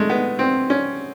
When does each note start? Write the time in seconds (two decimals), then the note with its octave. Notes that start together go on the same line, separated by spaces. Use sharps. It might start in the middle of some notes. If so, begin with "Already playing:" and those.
Already playing: G#3 A3
0.10 B3
0.39 C4
0.70 C#4